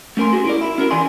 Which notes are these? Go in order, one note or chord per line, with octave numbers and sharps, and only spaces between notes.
A3 C#4 A#4 G#5 C6
F#4 G#4
E4 A#4 D5
E4
C#4 F#4 A#4
E3 G#4 D5 G#5 C6